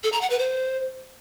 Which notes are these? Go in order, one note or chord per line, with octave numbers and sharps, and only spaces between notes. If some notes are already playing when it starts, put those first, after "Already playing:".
A4
A#5
F#5
B4
C5